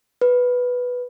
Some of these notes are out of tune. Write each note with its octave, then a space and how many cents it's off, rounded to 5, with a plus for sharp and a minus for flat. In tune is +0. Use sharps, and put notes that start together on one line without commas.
B4 +0